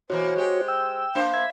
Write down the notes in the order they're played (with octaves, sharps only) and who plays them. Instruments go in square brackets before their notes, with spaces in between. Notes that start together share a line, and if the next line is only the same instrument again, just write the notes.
[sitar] B2 E3 A#3 [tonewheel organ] F#4 C#5 [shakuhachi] C5
[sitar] G#3 G4
[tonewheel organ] G5 E6
[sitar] A#3 D4 C5 [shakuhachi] F5
[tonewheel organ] E5 B5 G#6